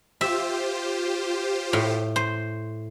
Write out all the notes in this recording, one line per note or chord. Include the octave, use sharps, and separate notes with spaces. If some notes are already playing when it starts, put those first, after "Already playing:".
F4 G4 C5 E5
A2
C5